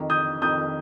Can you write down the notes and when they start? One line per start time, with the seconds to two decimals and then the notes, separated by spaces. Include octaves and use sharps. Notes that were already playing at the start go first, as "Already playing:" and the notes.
Already playing: F2 D#3
0.10 D#6 G6
0.42 F2 D#3 D#6 G6